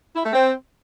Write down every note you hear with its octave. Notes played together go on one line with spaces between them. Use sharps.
E4
A3
C4